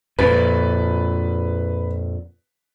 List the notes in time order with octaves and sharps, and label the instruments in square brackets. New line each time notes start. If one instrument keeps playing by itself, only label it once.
[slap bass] F2 A#2 [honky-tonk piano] B4